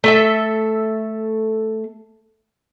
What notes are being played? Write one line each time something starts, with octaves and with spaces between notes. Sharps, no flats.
A3 A4 E5